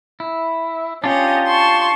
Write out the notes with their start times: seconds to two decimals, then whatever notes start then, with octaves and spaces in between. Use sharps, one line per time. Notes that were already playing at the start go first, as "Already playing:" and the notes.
0.20 E4
1.04 C#4 D4 F4 G4 D#5
1.47 A5 C6 C#6